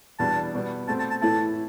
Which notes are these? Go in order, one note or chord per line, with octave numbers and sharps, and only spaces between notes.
E2 B2 G3 B3 D4 A5
B2 G3 B3
B2 A3 C4 A5
A5
A5
A2 E3 A3 E4 A5